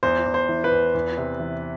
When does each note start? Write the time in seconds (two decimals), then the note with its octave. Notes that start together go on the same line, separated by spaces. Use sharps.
0.03 E2 C5
0.26 E2
0.34 C5
0.49 E3
0.64 B4
0.71 E2
0.95 E2
1.18 C3
1.40 E3